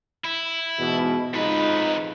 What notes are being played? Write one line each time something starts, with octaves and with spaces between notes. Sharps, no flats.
E4
E2 G#2 B2
F2 G#2 D#4 F4 B4